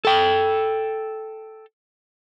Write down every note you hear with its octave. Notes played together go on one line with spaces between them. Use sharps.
A4 G5